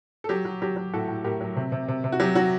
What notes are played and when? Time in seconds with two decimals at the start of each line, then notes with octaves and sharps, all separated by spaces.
0.24 A4
0.29 F#3 G4
0.45 F#3
0.62 F#3 G4
0.76 F#3
0.93 A2 F#4 A4
1.08 A2
1.24 A2 G4 A#4
1.41 F#3
1.56 C3
1.72 C3
1.88 C3
2.04 C3
2.12 F#4
2.20 F#3 G4
2.35 F#3 F#4